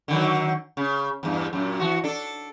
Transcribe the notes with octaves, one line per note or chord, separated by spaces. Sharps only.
D3 D#3 F#3
C#3
E2 G2
F#2 A#2
E3 F#4
D4 A4